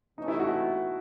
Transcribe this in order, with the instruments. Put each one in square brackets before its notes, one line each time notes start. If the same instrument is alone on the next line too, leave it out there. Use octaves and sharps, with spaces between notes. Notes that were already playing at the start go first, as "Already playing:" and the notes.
[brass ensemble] C3 E3 A3 C#4 [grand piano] D#4
[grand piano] E4
F#4